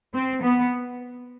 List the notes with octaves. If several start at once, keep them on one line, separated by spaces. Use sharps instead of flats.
C4
B3